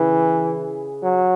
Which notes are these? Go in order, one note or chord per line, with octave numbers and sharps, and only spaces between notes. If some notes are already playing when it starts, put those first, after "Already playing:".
Already playing: C#3 E3 G#4
F#3